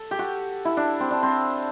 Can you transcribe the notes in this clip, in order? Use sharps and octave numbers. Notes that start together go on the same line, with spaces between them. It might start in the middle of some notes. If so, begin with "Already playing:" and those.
Already playing: A4
G4
F#4
E4
D4
C4
D4
C4